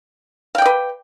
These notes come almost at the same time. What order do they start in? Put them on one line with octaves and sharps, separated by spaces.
F5 G5 D5 B4